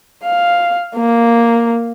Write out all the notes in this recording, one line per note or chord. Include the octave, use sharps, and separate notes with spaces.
F5
A#3